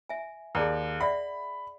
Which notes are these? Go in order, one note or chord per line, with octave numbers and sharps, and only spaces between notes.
E5 G#5
D#2 G#4 D5 A#5
D5 E5 F#5 B5